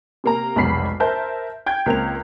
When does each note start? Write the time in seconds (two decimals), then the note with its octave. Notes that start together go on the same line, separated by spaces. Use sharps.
0.24 C3 A#3 A#5
0.56 F1 B1 G#2 B5 B6 C7
1.00 A#4 C5 E5 A5 G6
1.66 G5 G6 G#6
1.86 C#2 A#3 C4 F7